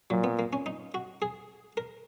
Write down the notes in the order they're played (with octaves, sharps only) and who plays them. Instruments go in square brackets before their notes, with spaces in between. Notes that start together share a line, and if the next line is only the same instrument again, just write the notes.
[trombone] A#2 [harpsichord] F#3
[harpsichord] B3
A#3
C#4
D#4
F#4
G#4
A#4